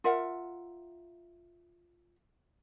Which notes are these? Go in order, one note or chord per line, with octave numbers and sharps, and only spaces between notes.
F4 A#4 E5 F#5